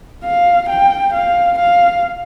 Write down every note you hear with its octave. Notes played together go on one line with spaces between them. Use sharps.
F5
G5
F5
F5